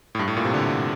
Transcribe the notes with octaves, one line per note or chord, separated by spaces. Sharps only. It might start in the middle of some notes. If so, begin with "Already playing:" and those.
A2
G2
A2
A#2
C3
D3